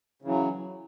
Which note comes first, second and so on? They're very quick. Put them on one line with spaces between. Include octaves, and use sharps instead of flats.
C#3 E3 F#3